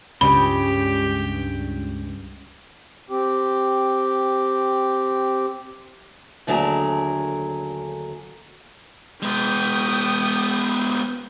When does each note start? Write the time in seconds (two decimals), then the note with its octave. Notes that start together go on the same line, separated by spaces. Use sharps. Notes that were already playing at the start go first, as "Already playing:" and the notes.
0.21 C#2 G2 C#3 G4 G5 B5
3.10 C4 G4
6.47 D#2 D3 F#3 A3 G#4 A#4
9.22 G#3 B3 G5 D#6